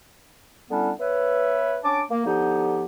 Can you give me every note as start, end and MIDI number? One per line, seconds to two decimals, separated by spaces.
0.71 0.91 50
0.71 0.91 55
0.71 0.91 59
0.71 0.91 61
0.71 0.91 62
0.71 0.91 64
1.00 1.78 59
1.00 1.78 71
1.00 1.78 73
1.00 1.78 76
1.84 2.01 61
1.84 2.01 62
1.84 2.01 81
1.84 2.01 86
2.10 2.24 58
2.25 2.85 50
2.25 2.85 53
2.25 2.85 59
2.25 2.85 63
2.25 2.85 67